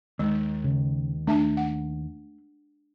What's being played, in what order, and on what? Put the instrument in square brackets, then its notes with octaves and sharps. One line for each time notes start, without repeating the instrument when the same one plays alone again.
[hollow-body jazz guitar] D#2 D#3 [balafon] G#3
[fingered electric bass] C#3
[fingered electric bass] A3 [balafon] D4 E5 A5
[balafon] F#5